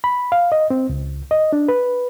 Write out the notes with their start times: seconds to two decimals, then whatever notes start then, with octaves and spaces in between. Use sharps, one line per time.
0.04 B5
0.32 F5
0.52 D#5
0.70 C4
0.89 C#2
1.31 D#5
1.53 D4
1.68 B4